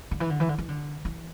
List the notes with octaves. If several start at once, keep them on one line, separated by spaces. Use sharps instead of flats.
D3
E3
D3
E3
D3
E3
D3
E3